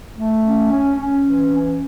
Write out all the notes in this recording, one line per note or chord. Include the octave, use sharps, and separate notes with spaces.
A3
C#4
C#4
C#4
E3
C#4